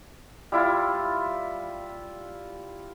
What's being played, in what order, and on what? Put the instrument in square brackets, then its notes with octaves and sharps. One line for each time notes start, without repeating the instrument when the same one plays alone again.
[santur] G3 E4 F4